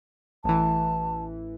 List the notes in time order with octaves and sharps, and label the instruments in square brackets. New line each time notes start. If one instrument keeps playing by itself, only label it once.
[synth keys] A1 E3 [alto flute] A5